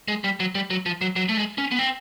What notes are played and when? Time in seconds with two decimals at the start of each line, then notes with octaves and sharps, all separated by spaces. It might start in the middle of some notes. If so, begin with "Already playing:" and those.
0.08 G#3
0.24 G3
0.40 F#3
0.55 G3
0.70 F#3
0.86 F3
1.01 F#3
1.16 F#3
1.29 A3
1.37 G#3
1.58 C#4
1.71 B3
1.79 C4